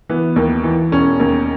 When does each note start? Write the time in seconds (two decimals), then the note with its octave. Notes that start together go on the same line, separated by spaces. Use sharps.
0.10 E3 B3
0.36 D#2
0.64 E3
0.92 E1 C#4
1.20 D#2